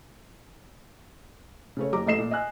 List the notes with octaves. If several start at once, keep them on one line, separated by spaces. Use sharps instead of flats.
C#3 A3 C#5
F#1 G4 A#5 D6
A1 A3 D#5 C7 E7
A#2
D#5 G#5 F#6